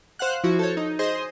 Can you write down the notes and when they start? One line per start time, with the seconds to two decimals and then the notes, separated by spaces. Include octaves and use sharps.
0.19 C5 F5 F#5 F#6
0.44 F3 E4 F#4
0.59 A4 C5 C#5
0.77 D#4
0.99 G#4 C5 D#5 C6